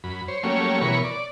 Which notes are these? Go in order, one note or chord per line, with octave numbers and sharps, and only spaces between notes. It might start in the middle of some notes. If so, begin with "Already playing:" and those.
F#2 B5
C5 C#5
F#3 G3 A3 A#3 C#4 C#5
B2 E3 A#4 C#5 B5 C#6
D5